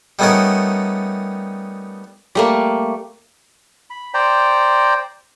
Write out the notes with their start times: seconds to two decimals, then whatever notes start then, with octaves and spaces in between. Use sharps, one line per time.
0.19 G3 A3 B3 C#4 D#4 A#4
2.35 G3 A3 A#3
3.90 B5
4.14 C5 D5 G5 A#5